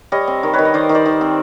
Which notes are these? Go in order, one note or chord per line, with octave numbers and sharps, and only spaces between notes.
G3 C#5 D#5
C4
D#3
D#3 B4 C#5
D#5
D#3 C5 D5
D#3
C5 D5
D#3
C4